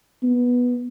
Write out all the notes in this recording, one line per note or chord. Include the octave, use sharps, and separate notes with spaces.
B3